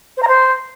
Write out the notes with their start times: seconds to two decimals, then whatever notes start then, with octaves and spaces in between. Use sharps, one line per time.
0.17 C5
0.22 A#5
0.28 C5